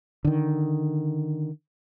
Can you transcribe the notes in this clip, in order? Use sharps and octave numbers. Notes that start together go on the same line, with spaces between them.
D3 D#3